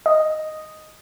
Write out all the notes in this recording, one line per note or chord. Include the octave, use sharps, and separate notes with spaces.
D#5